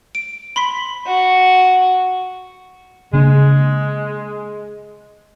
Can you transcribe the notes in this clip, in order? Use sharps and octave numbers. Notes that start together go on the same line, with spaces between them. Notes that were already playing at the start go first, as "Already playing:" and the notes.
D7
B5 C6 B6
F#4
C#3 G#3 A#3 D4